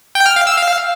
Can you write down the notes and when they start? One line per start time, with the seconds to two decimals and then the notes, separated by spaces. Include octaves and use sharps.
0.15 G5
0.26 F6
0.36 F5
0.47 E6
0.57 F5